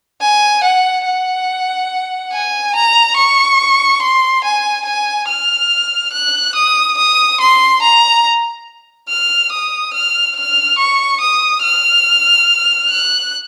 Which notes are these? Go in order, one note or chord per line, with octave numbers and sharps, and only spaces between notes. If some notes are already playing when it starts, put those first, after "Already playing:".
G#5
F#5
F#5
G#5
A#5
C#6
C6
G#5
G#5
F6
F#6
D#6
D#6
C6
A#5
F6
D#6
F6
F6
C#6
D#6
F6
F#6